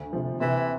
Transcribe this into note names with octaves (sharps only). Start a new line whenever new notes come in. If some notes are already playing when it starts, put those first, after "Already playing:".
Already playing: D2
C3 F3
C3 E3